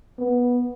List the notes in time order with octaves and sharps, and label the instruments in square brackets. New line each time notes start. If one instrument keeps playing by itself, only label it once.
[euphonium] B3